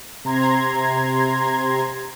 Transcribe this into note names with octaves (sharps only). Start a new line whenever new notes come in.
C3 A#5 C6 G#6